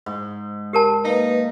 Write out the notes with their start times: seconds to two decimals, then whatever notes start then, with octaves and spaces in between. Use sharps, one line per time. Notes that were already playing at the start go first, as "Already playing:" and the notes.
0.06 G#2
0.73 G4 A#4 A5
1.05 A#3 D#4 B4 F5